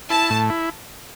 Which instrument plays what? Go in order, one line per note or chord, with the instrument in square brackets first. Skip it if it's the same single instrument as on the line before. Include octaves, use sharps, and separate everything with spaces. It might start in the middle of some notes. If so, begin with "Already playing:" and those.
[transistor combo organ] E4 [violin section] A5
[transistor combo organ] A2
E4